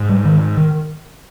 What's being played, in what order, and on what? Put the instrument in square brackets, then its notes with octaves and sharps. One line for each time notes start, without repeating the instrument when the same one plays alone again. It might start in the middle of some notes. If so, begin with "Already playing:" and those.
Already playing: [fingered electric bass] G#2
G3
D#3
D#3